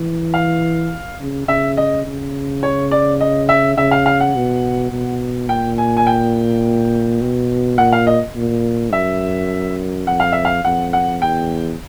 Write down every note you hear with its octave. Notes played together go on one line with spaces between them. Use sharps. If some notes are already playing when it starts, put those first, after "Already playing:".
Already playing: E3
F5
C#3
C#3 E5
D#5
C#3
C#5
D5
D#5
E5
C#3 E5
F5
F5
F#5
B2
B2
A#2 G5
G#5
G#5
G5
B2
A#2 F#5
F5
D#5
A#2
F#2 E5
F2 F#5
F5
E5
F5
F2 F#5
F#5
E2 G5